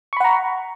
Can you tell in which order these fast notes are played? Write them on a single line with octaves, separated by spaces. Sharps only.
C#6 B5 F#5 A#5